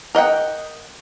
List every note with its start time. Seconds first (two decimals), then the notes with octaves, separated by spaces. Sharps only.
0.15 A#4 D#5 F#5 G5